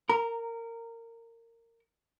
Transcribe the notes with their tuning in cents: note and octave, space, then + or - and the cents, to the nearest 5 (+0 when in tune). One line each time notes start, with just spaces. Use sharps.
A#4 -20 A#5 +0